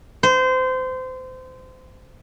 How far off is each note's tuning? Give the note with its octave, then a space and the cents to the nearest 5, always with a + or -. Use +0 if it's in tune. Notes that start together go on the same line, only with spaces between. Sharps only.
C5 -25